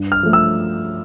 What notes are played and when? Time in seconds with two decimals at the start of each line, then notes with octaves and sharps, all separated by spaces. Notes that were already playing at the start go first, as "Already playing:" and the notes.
Already playing: G2
0.12 F6
0.23 F3 A3
0.33 E6